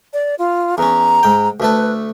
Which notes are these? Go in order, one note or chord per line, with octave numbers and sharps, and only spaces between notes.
D5
F4
E2 C#4 A#5
G#2 G5
D2 A3 A4 B4